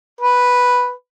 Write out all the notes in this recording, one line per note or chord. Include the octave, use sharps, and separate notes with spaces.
B4